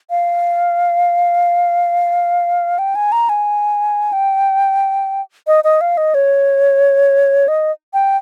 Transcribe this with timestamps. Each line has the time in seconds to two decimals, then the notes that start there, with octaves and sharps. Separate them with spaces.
0.10 F5
2.79 G5
2.95 G#5
3.12 A#5
3.29 G#5
4.13 G5
5.47 D#5
5.64 D#5
5.81 F5
5.97 D#5
6.14 C#5
7.48 D#5
7.94 G5